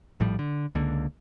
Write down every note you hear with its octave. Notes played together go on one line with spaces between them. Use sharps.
A#1 A2 F3 G3
D3
C#2 D3 A#3